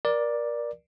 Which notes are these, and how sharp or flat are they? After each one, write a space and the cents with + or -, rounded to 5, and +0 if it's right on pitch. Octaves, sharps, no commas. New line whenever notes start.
A#4 +25 D5 +5